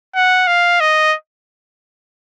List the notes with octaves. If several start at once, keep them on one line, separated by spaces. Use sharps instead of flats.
F#5
F5
D#5